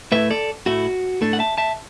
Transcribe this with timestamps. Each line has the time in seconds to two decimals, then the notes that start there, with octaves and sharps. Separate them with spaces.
0.12 A2 A3 E4 B4 E5
0.31 A4 D5
0.66 A2 A3 E4 F#4
1.21 A2 A3 D4 A4
1.33 F#5
1.39 E5 A5
1.58 E5 A5